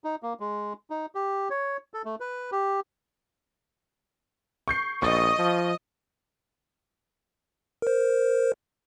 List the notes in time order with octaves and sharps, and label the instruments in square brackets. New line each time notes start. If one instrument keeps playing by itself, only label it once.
[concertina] D#4
A#3
G#3
D#4
G4
C#5
A4
A3
B4
G4
[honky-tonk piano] C#6 G6 C7
[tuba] A#1 [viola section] D#5 [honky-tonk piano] C#6 A6
[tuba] F3
[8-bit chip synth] A#4 C5